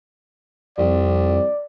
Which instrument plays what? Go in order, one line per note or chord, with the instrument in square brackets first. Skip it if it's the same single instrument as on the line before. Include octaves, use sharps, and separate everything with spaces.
[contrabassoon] C2 [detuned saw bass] F2 [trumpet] D5